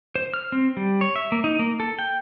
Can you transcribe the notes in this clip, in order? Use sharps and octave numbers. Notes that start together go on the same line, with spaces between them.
C5
F6
C4
G3
C#5
E5
A#3
D#4
A#3
A4
G5